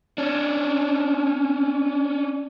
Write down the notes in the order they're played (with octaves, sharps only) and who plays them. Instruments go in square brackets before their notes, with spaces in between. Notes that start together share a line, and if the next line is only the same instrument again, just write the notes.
[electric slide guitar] C#4 D4